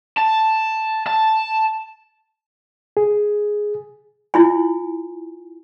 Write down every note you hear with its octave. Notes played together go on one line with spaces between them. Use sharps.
A5
A5
G#4
E4 F4 G#5